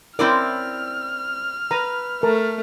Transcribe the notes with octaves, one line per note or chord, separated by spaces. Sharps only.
C4 C#4 E4 A#4 D5 F6
B4 A#5
A3 A#4 A5